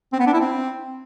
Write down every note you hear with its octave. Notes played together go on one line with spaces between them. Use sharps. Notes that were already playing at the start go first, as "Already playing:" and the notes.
C4
B3
D4
E4
C4